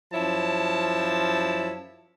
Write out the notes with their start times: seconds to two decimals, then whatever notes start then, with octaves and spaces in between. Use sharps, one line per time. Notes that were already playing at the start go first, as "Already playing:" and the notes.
0.13 F#2 F3 E4 C#5 A5